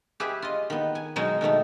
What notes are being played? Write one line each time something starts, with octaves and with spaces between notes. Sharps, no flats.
G4 G#4 B4 E5
F4 D#5
D#3 B3
G#5
B2 F#3 G#3 D#4
B2 D#3 A3 D#4